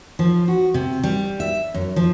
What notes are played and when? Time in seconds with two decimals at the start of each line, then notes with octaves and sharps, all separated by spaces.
0.19 F3
0.48 F#4
0.74 C3
1.03 G3
1.40 E5
1.74 F#2
1.96 F3